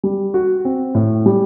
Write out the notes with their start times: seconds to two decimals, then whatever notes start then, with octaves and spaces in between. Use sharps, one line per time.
0.03 G3
0.34 F#4
0.65 C4
0.95 A2
1.26 G3